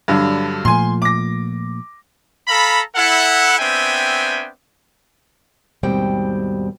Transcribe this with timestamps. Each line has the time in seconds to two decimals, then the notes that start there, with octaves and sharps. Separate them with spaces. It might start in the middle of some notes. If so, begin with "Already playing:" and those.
0.08 G2 D3 F#3
0.65 A#2 F3 A3 G#5 C6
1.02 D6 A#6
2.48 A4 F5 A#5 B5
2.96 E4 A4 F#5
3.59 B3 C4 D4 E5 G5 G#5
5.83 D#2 G#2 B2 G3 C4 G5